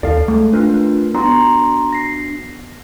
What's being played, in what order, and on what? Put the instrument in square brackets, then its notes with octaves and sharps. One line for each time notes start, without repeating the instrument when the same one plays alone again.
[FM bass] D#2 [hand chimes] A4 [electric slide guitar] D5 F5
[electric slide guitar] G#3 [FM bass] A3
[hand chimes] D4 [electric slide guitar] F4 A#4 B4
[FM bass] B3 [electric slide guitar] D4 F#4 [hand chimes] A#5 C6
[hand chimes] A#6 C7